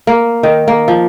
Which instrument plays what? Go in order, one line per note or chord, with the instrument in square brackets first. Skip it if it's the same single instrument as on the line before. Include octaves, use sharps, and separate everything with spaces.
[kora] A#3
D#3
A#3
F3